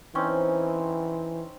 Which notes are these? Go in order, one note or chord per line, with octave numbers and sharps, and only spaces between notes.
E3 C4 C#4 D#4